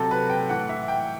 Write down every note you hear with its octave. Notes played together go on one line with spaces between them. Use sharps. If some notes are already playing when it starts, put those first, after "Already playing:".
Already playing: C3 F#3 A4
B4
G5
A2 E3 F#5
E5
G5